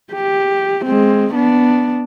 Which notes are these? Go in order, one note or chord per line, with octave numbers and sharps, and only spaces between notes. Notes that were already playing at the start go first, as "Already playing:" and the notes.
G4
G#3 C4
B3 D4